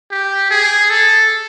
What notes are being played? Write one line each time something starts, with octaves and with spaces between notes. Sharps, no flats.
G4
G#4
A4